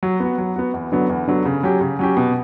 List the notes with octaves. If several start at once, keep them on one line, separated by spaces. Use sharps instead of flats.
F#3
B3 F#4
F#3
B3 F#4
E2
D3 F#3 B3
E2
D3 F#3 B3
C#3
F#3 C#4 G4
C#3
F#3 C#4 G4
B2